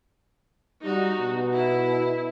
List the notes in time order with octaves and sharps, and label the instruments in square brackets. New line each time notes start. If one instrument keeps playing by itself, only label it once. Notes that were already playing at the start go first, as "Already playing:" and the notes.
[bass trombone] G3 [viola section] D#4 F#4
[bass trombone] B2
[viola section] E4